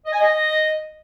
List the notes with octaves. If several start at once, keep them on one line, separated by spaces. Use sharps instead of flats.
D#5
G#5
D#5